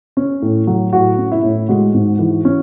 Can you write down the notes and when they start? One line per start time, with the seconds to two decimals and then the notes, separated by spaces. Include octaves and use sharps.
0.17 C#4
0.42 A2
0.67 F#3
0.93 A2 F#4
1.18 C#4
1.32 E4
1.43 A2
1.68 G#3 F#4
1.94 G#2
2.19 E3
2.45 C#4